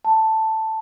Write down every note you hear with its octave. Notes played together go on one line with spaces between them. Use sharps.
A5